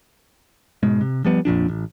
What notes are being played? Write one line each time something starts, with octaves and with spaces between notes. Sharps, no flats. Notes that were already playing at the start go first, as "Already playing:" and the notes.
G#2 B2 G#3
C3
F3 G3 B3
F2 A#2 F3 D4
A1